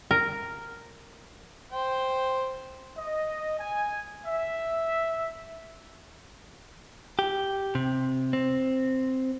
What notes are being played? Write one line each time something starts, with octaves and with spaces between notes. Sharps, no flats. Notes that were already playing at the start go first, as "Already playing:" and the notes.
A#4
C5 G5
D#5
G#5
E5
G4
C3
C4